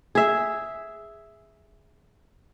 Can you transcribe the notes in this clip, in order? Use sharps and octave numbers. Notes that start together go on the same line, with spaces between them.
G#4 E5